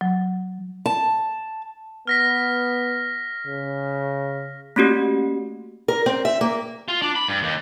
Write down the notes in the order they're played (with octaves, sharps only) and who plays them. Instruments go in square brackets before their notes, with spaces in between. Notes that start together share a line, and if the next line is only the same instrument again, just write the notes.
[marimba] F#3
[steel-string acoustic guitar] A5
[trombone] B3 [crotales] F6 A#6 B6
[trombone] C#3
[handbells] A3 A#3 C#4 F#4 G4
[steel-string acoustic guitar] A#4
C4
E5
A#3
[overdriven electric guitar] F4
D4
B5
G2
D#2